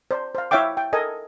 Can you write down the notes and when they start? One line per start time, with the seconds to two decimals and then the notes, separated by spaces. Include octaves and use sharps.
0.11 C5 D5
0.35 C5 F5
0.51 E4 C#5 E5 F5 G5 D6
0.77 G5
0.93 A4 A#4 D#5 G#5